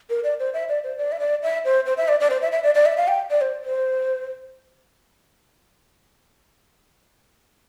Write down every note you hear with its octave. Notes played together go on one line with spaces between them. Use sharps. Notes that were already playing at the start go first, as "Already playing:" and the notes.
A#4
D5
C5
E5
D5
C5
D5
E5
D5
E5
C5
C5
E5
D5
D5
C5
E5
E5
D5
D5
E5
F5
G5
D5
C5
C5